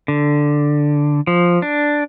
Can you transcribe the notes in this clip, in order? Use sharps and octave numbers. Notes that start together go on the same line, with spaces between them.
D3
F3
D4